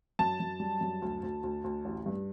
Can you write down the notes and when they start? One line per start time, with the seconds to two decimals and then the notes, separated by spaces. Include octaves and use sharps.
0.19 F#2 A5
0.40 F#2
0.60 G3
0.81 F#2
1.02 D2
1.23 D2
1.43 D2
1.64 D2
1.85 A1
2.06 G2